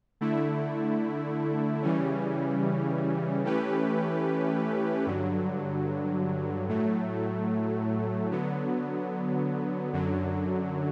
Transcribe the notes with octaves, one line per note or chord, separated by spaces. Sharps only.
D3 A3 E4
C#3 E3 G3 C#4
E3 A3 C#4 G4 B4
G2 D3 F#3
A2 F#3 A3
D3 F#3 B3
F#2 D3 F#3